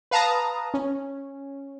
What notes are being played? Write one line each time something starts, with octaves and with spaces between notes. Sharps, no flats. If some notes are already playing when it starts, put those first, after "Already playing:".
B4 F5 A5 A#5 D#6
C#4